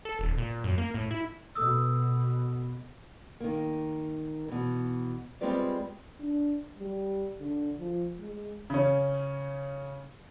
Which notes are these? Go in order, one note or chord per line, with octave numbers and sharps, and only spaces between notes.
A4
D#1
A#2
F#2
A#3
A2
E4
B2 A4 D#6 E6
D#3 A#3
B2 E3
G3 G#3 C4 F4 B4 D5
D4
G3
D3
F3
G#3
C#3 C#4